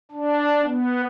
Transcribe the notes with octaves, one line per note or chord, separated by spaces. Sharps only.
D4
B3